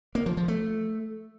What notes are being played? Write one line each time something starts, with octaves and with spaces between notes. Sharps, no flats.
A#3
F3
F3
A3